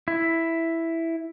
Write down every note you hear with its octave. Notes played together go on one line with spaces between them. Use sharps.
E4